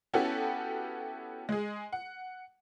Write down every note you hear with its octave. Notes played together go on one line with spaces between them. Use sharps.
B3 C#4 E4 F#4 G4 A4
G#3 G#4
F#5